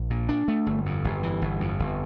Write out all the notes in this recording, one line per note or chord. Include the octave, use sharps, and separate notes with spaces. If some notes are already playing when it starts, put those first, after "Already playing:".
Already playing: A#1
A#2
D4
A3
G1
F2
G1
E3
G1
F2
G1